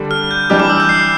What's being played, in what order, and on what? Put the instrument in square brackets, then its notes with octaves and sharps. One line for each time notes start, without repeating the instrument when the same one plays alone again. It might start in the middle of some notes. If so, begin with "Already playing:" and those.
Already playing: [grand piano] D3 G3 D4 A4
[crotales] F6
G6
[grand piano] E3 G3 D4 G4 [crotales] F6
[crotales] D6
E6
G6
C7